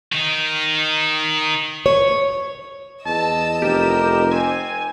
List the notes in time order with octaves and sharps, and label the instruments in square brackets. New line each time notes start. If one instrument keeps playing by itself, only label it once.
[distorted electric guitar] D#3 D#4
[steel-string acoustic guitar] C#5
[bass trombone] E2 [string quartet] D#5 E6 [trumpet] A5
[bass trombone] F1 [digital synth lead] G4 [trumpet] A#4
[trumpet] C4 [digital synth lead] G#5